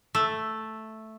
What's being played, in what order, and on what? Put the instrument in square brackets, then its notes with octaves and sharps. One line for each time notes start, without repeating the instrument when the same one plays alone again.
[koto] A3